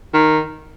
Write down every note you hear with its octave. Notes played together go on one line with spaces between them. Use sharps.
D#3